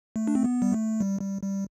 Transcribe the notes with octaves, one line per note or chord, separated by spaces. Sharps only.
A3
D4
C4
B3
G3
A3
G3
G3
G3